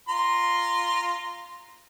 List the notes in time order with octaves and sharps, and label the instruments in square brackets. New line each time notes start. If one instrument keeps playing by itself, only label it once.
[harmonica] F4 A#5 C6